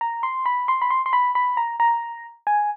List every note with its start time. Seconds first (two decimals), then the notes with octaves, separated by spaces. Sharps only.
0.01 A#5
0.23 C6
0.46 B5
0.68 C6
0.82 B5
0.90 C6
1.06 C6
1.13 B5
1.35 B5
1.57 A#5
1.80 A#5
2.47 G#5